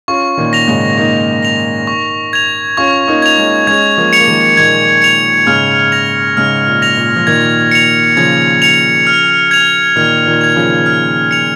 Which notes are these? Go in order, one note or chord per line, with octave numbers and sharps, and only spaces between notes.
C#4 F4 C#6
A#2 D#3
A#6 F7
G#2 C#3
A#3 D#4 C#6
A#6 F7
C#6
G#6 F7
C#4 F4 C#6
A#3 D#4
G#6 F7
G#3 C#4
G#3 C#4 G#6
F3 A#3
C#7 F7
A#3
D#3 G#3
A#2 D#3 G#6
C#7 F7
G#2 C#3 F6
A#6 F7
G#2 C#3 F6
A#2
A#6 F7
A#2
F3
A#2 D#3 G#6
C#7 F7
C#3 F3 G#6
C#7 F7
F6
G#6 F7
A#2 D#3 F6
A#2 D#3
G#6 F7
C#3 F3
F6
C#7 F7